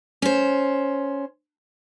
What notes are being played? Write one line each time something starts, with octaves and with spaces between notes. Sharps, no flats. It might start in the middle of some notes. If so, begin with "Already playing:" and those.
C#4 C5